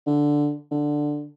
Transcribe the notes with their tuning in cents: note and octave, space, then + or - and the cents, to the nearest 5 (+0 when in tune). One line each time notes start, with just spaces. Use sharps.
D3 +0
D3 +5